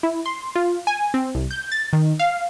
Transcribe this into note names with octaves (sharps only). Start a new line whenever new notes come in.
E4
C6
F4
G#5
C4
C2
G6
A6
D#3
F5